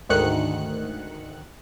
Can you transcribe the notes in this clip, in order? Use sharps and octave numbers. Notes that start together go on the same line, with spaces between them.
D2 G#2 D#3 F#6 C#7